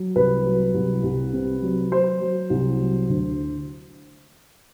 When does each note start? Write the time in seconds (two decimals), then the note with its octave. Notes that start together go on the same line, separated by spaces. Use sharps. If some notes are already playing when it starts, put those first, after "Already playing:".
Already playing: F#3
0.15 C2 B4
0.45 F#3
0.74 C2
1.03 C2
1.33 C3
1.62 F#3
1.92 F#3 C5
2.21 F#3
2.50 C2
2.80 F#3
3.09 D2